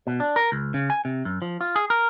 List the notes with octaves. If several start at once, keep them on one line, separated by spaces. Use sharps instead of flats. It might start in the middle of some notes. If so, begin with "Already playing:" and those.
B2
D4
A#4
C#2
C#3
G#5
C3
F#2
F3
F4
G#4
A#4